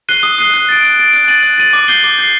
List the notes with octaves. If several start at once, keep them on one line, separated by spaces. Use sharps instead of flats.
F#6 C7 D#7 G7
D#6
F#6 C7 D#7 G7
F#6
A6 D7
F#6
A6 D7
F#6
A6 D#7 F#7
F#6
A6 D#7 F#7
D6
G6 C7 G7
D6
G6 C7 G7